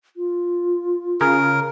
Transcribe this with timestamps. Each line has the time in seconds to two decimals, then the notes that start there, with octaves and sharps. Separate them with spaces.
0.17 F4
1.21 C#3 A#4